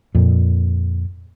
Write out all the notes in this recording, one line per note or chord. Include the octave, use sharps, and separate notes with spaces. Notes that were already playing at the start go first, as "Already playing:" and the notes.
F2 A#2